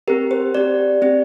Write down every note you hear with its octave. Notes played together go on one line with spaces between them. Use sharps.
C4 G4 A#4
C5
C4 G4 D5
C4 G4